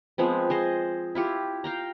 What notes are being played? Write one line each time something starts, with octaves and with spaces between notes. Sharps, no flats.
F3 G#3 B3 C4
G#4 C5 D#5
E4 F4 G4
F5 G5 A#5